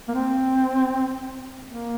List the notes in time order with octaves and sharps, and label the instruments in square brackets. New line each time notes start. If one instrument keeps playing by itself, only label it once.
[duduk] A#3
C4
A#3